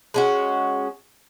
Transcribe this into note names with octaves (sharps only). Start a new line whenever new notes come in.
G#3 C#4 F#4